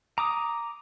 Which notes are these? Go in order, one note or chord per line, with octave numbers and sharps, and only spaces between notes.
A#5 D6 D#6